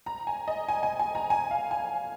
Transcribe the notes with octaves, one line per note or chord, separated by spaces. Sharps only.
A#5
G#5
D#5
G#5
G#5
G#5
A#5
G#5
F5
G#5